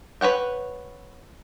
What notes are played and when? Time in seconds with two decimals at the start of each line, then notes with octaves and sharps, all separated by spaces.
0.21 B4 C#5 F#5 G5